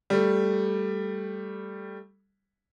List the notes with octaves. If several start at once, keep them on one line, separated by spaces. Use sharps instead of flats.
G3 A3